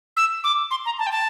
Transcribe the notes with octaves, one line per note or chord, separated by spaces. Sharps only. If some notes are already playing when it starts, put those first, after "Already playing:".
E6
D6
C6
A#5
A5
G5
A5